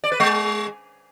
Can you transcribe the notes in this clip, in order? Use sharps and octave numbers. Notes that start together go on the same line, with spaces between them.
D5
B4
G#3